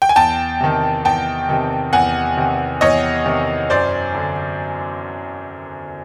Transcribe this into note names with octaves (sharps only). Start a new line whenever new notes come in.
G5
G#5
E2 G5 A5
C3 D#3
E2 G5 A5
C3 D#3
E2 F#5 G#5
C3 D#3
E2 C#5 D#5
C3 D#3
F#2 C5 D5
D3